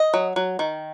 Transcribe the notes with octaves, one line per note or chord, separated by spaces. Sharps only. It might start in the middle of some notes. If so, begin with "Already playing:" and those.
Already playing: D#5
F#3
F#3
D#3